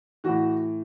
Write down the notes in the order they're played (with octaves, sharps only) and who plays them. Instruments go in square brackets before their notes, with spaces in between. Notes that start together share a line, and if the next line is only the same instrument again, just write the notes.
[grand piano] A2 E3 F#4